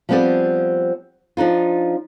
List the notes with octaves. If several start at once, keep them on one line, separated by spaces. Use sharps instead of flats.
F3 G3 B3 C4 G#4 D5
F3 D4 D#4 F4